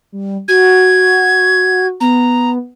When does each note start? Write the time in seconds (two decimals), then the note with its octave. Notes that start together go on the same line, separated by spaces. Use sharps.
0.12 G3
0.48 F#4 G#6
2.01 B3 A#5